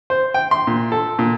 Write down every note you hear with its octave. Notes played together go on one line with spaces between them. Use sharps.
C5
G5
C6
A#2
A4
A#2